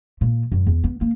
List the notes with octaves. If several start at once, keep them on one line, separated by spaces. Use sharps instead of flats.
A#2
F#2
E2
B3
A#3